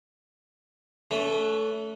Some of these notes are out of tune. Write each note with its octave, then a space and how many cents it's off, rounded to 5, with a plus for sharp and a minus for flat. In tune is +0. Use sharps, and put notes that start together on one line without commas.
A3 +0 C#4 +35 B4 +0